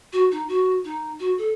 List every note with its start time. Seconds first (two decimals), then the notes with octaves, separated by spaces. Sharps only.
0.13 F#4
0.32 D#4
0.49 F#4
0.85 D#4
1.20 F#4
1.38 A4